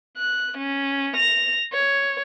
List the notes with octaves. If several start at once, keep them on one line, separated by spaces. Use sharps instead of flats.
F#6
C#4
A#6 F7
C#5